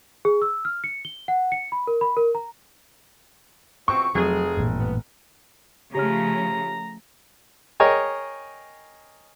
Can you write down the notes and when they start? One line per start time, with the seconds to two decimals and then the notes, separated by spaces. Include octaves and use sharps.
0.25 G#4
0.42 E6
0.65 F6
0.84 C#7
1.05 G7
1.28 F#5
1.52 C#7
1.72 B5
1.87 A#4
2.01 B5
2.17 A#4
2.35 A#5
3.88 B2 F3 C4 C#6
4.15 F1 F#3 G#4
4.57 A1 G2 A#2
4.79 B3
5.95 C#3 F3 A3 G4 C#5 A#5 F6
7.80 G#4 A#4 C#5 D#5 G5